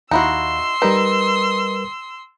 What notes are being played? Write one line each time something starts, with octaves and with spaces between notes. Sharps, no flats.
D#2 D#4 E4 F#4 F5 C6 E6
G3 D#4 A#4 B4